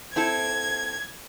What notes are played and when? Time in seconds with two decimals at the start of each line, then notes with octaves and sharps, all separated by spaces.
0.16 C4 E4 A4 G#6